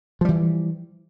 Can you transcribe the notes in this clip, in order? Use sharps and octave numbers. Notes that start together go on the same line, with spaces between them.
E3 F3 G3